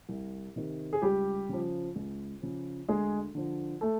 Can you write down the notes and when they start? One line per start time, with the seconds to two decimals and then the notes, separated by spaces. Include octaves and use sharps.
0.09 C2
0.56 C3 D#3
0.93 G#4
1.02 C#2 G3 G4
1.49 C#3 F3
1.96 C#2
2.42 C#3 F3
2.89 D2 G#3 G#4
3.35 D3 F3
3.81 A3 A4